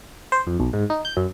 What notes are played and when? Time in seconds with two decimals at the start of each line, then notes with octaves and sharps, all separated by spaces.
0.32 C5
0.47 F2
0.60 B1
0.73 G#2
0.90 D#4
1.05 G6
1.17 F#2